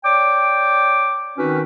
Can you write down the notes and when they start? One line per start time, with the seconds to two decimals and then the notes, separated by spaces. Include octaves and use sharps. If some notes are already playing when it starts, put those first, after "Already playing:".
0.05 C#5 D5 G5 D6
1.38 D#3 C4 C#4 D#4 F#4 B4